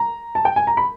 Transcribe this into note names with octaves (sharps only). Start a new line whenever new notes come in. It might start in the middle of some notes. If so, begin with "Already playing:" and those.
Already playing: A#5
A5
G5
G#5
A#5
B5